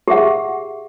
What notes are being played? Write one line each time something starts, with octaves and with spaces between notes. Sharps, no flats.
G4 G#4 E5 F#5